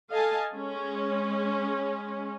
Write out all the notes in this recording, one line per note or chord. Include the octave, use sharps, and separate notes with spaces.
A4 D#5 F5 G#5 A5
G#3 C#4